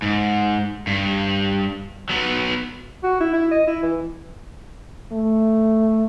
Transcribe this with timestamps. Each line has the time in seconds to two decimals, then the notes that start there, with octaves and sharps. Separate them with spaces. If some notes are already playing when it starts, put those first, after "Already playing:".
0.02 G#2
0.87 G2
2.09 F#3 B3
3.03 F#4
3.21 E4
3.34 E4
3.51 D#5
3.67 E4
3.83 E3
5.13 A3